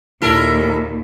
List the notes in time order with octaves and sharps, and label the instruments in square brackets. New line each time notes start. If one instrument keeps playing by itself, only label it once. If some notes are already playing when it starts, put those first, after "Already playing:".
[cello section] D#2 A#2 [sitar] E4 A4 A#4